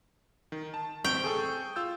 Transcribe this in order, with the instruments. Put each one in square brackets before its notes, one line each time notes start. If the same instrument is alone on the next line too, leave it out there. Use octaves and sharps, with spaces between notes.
[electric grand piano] D#3
A5
[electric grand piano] A1 C4 C#6 [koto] G5
[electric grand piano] G#4 A4 C#6
F4 E6 G6